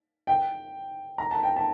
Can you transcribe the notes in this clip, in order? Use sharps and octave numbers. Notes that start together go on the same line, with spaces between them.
G5
A#5
A5
G5
A5